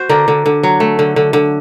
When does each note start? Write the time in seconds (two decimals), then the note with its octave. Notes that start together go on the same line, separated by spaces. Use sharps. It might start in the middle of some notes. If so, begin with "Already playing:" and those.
Already playing: F#4 C5
0.09 D3 A#4 D5
0.28 D3
0.46 D3
0.63 F#3
0.80 A3
0.99 D3
1.16 D3
1.33 D3